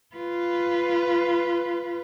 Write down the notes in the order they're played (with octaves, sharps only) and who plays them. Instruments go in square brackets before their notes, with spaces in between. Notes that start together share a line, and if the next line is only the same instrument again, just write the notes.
[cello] F4 B4